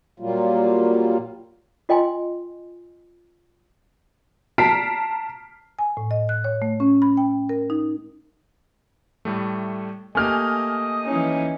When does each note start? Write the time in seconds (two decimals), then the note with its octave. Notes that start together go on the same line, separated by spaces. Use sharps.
0.20 A#2 F#3 G3 A#3 F4
1.89 F4 D#5 G5 G#5 C6
4.58 A5 A#5 F6 B6 C7 D7
5.79 G#5
5.97 A2
6.11 D#5
6.29 F#6
6.44 C#5
6.62 A3
6.80 C#4
7.02 B5
7.17 G5
7.49 A#4
7.70 D#4
9.25 A2 G3 A3
10.15 A3 A#3 G4 D#5 G#5 F6
11.05 E3 C#4 D#4